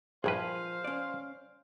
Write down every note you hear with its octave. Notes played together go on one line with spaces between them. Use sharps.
A#1 G2 F3 F4 G#4 B4 C5 F5
C#4 D5